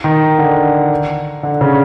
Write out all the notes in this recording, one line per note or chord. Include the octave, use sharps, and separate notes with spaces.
D#3
D3
D3
C#3